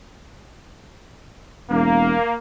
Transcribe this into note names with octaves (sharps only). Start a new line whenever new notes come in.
E1 A#3